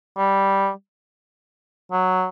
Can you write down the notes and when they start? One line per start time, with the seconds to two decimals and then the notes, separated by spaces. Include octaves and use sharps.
0.18 G3
1.92 F#3